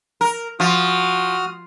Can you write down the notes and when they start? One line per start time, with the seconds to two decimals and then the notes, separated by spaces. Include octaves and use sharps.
0.21 A#4
0.60 F3 F#4 D#6 F6